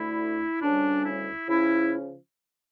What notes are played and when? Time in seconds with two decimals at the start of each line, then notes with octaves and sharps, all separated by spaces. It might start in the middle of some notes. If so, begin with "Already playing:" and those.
Already playing: D2 D3 A3 E4
0.62 D2 C#3 G3 C#4 D4
1.05 E4
1.48 C#3 F3 C#4 E4